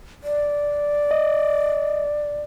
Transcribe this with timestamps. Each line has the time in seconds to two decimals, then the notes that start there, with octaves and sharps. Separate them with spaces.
0.23 D5
1.11 D#5